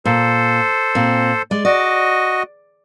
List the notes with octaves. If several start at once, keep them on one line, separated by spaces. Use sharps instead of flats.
A#2 A4 C5
A#2 C4
G#3 D5
F#4 D5 D#5